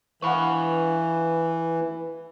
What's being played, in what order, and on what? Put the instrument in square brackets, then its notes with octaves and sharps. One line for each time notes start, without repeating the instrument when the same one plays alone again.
[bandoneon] E3 [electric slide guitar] B4 F5 [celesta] F#5 B5 C#6